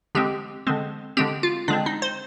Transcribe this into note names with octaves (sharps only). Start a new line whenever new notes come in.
D3 G#3 C4 G4
D3 G#3 C4
D3 G#3 C4 G4
F4
D3 G#3 C4 D4
D#4
C5